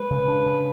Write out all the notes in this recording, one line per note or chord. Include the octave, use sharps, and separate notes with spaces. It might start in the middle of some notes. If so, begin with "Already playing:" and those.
Already playing: G#3 B4
C#3
D4
C#3